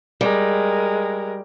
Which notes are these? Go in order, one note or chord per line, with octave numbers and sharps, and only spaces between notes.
G3 G#3 A#4